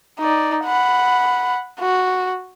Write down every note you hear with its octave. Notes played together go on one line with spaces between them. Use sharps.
D#4 D5
F#5 B5
F#4